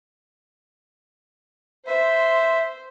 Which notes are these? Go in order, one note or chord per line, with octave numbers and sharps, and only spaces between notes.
C5 E5